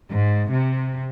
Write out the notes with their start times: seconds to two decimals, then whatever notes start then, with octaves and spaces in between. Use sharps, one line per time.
0.11 G#2
0.51 C3